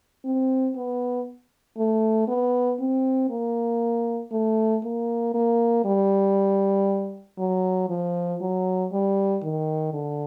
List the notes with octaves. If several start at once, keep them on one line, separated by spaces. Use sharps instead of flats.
C4
B3
A3
B3
C4
A#3
A3
A#3
A#3
G3
F#3
F3
F#3
G3
D#3
D3